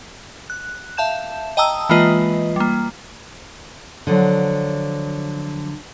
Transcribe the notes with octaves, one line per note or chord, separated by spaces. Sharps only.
F#6
E5 F5 A5 G6 E7
D#5 G5 A5 A#5 D#6 E6
E3 G#3 A#3 F4 B4 D#5
G3 A#3
D3 F3 F#3